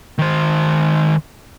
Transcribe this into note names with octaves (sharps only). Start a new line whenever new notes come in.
D#3 C5